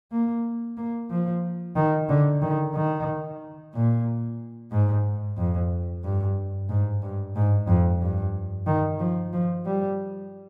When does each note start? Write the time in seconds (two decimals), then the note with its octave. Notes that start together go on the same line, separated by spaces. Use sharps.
0.12 A#3
0.77 A#3
1.10 F3
1.76 D#3
2.09 D3
2.42 D#3
2.74 D#3
3.74 A#2
4.72 G#2
5.37 F2
6.04 G2
6.70 G#2
7.02 G2
7.36 G#2
7.68 F2
8.01 G2
8.67 D#3
9.00 F3
9.33 F3
9.65 G3